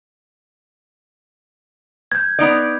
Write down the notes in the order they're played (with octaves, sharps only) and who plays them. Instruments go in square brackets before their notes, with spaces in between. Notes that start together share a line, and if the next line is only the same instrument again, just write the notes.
[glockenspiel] G6 G#6
[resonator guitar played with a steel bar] B3 D#4 D5